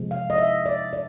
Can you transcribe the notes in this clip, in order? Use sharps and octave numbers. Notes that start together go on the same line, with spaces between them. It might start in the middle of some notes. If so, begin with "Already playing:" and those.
Already playing: C3 F3 G#3
F5
D#5
E5
D5
D5